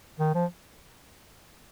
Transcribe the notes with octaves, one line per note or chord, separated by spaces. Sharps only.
D#3
F3